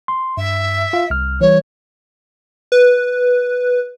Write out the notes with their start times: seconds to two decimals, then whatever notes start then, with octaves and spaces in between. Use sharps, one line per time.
0.08 C6
0.37 G2 E5
0.93 F4 F5
1.10 C2 F6
1.41 E3 G3 C#5
2.72 B4